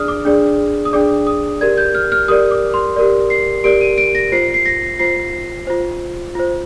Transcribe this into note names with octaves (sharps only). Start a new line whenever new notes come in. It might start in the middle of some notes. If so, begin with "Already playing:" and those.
Already playing: D4 G#4 D5 D#6 F6
D6
D4 G#4 D5
D#6
D4 G#4 D5 D6
D#6
G4 A#4 D5 G#6
G6
F6
F6
G4 A#4 D5 D#6
D6
C6
G4 A#4 D5
C7
G4 A#4 D5 D7
D#7
D7
A#6
F4 C5 C7
C7
A#6
F4 C5 C7
F4 C5
F4 C5